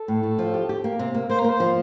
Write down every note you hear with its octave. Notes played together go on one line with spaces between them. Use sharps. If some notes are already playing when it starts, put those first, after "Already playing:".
Already playing: A4
A2
A2
F3
G4
G4
A#3
C3
A#3
A#3 C5
A#4
A#3
C5
F3